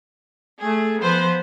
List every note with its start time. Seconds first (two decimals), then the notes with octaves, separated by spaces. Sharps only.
0.59 A3 G#4
1.01 F3 B3 B4 C5